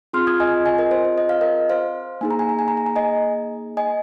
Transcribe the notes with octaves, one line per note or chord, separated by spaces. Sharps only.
C4 F4 G#4 C6 F6
D#6 G#6
D#5 G#5
D#5 G#5
A#4 D#5
C5
C5
D#5
F5
A#4 D#5
C5 F5
A#3 D#4 G#4 G#5
A#5
G#5
A#5
G#5
A#5
G#5
A#5
D#5 G#5
D#5 G#5